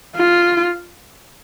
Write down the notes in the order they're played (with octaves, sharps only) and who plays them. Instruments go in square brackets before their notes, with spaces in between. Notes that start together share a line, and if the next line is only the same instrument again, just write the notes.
[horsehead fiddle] F4